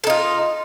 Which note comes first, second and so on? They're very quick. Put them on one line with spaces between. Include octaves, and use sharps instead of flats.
A4 D#4 F4